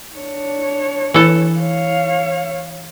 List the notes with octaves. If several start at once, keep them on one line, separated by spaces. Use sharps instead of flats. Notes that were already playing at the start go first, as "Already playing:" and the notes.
D4 C#5
E3 A4
C#5 F5